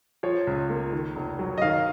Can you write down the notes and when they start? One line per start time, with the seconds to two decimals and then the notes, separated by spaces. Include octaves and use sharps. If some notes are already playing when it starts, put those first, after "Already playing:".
0.23 F3 C#5
0.47 C#2
0.70 A#3
0.93 D#3
1.15 F1
1.39 F#3
1.58 D#5
1.62 D#3 F5